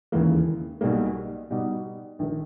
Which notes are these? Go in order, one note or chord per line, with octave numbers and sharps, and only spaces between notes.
E1 D#2 C#3 E3 A#3
B1 B2 G3 A#3
B2 G3 B3 D#4 G4
A#1 D#3